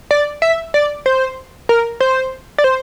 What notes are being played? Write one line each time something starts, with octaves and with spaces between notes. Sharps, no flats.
D5
E5
D5
C5
A#4
C5
D5
C5